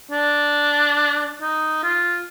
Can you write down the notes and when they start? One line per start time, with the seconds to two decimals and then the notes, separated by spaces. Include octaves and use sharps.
0.11 D4
1.42 D#4
1.83 F4